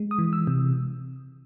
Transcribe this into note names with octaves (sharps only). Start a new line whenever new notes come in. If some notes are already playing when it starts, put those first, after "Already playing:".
Already playing: G#3
D#6
E3
E6
C3